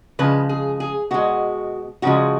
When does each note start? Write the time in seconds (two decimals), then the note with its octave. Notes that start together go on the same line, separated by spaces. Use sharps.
0.19 C#3 F3 G#3 B4
0.49 G#4
0.80 G#4
1.11 B2 G#3 F#4
2.02 C#3 F3 G#3 F#4